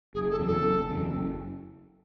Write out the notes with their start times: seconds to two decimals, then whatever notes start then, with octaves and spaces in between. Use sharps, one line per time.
0.14 F#1 G#4
0.31 A4
0.40 E2 C#3 F#3
0.47 A4
0.64 F#1
0.89 E2 C#3 F#3
1.14 F#1